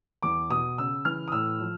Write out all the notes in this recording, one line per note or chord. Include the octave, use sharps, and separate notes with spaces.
E2 D6
B2 D#6
C#3 E6
E3 F6
D#6
A2 E6
F3